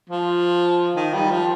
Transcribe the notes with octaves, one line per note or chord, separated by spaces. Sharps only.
F3
D#3
G3
F3